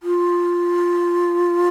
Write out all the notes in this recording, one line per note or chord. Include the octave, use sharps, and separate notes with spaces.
F4